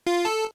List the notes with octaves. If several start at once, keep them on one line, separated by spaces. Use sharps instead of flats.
F4
A4